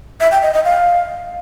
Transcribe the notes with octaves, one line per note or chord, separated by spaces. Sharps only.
E5
G5
D#5
D#5
F5